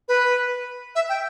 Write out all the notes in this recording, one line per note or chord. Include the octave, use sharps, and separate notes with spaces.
B4
E5
G5